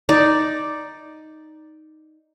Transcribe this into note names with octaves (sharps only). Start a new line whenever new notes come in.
D#4 D5